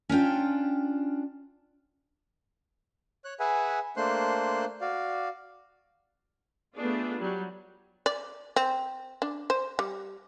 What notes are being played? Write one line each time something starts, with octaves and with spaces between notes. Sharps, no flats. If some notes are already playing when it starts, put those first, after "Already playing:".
C#4 D4 F4 G5
C#5 F#6
G#4 B4 E5 F#5 G#5
A3 A#3 D4 C5 C6 F#6
F#4 D5 F5
A3 B3 D4 F4 G#4
F#3 G3
D5
C4
D4
C5
G3